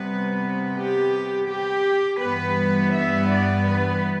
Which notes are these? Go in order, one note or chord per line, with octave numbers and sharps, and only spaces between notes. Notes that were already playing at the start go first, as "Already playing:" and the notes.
Already playing: C3 G3 B3 B4
G4
G4
G2 E3 B3 B4
E5
D5
B4